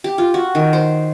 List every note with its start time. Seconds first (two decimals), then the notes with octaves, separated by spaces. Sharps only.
0.04 G4
0.18 F4
0.34 F#4
0.55 D#3
0.73 C5